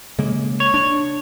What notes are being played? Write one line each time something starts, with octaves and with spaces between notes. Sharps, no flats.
C#3 G#3 A#3
C#5
D4